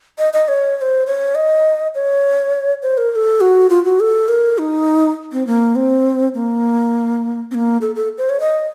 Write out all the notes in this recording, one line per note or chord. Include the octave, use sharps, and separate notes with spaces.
D#5
D#5
C#5
C#5
C5
C#5
D#5
C#5
C5
A#4
A#4
A4
F#4
F4
F#4
A4
A#4
D#4
C4
A#3
C4
A#3
C4
A#3
A4
A4
C5
C#5
D#5